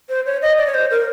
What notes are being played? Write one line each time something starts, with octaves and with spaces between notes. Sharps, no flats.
C5
C#5
D#5
D5
C#5
C5
A#4